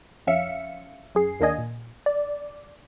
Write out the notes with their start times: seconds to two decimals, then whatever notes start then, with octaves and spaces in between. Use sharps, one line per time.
0.27 F2 C#4 E5 F5 C#7
1.15 F#2 G#4 C7
1.40 D#2 D#3 A#3 D4 D#5 G#5
1.58 A#2
2.06 D5